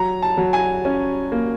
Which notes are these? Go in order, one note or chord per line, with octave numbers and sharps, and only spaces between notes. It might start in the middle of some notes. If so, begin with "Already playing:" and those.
Already playing: F#3 A#5
A5
F#3
G#5
C#4
A#3